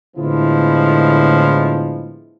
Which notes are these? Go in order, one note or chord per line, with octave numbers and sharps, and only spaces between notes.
A2 D3 F3 G#3 B3 E4